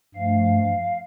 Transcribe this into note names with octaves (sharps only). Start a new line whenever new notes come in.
G2 F3 A3 F5